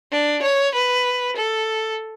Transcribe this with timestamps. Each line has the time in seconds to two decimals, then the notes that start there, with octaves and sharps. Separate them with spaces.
0.12 D4
0.43 C#5
0.74 B4
1.37 A4